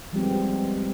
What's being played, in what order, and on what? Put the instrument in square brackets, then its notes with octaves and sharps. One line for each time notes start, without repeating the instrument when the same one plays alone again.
[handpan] F3 G3 G#3 B3 C4 G4